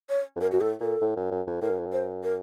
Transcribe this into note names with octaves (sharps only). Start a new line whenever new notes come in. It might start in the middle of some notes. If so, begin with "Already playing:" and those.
C#5
F2
F#2 A#4
F#2 F#4
A2 A4
A#2 A4
A2
F#2
F#2
F2
A2 A#4
F#2
F2
F#2
C5
A#4